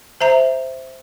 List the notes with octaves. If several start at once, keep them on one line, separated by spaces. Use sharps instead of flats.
C5 E5 A#5